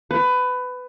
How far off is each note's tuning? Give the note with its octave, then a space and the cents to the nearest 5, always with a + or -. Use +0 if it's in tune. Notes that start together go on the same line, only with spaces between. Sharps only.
B4 +20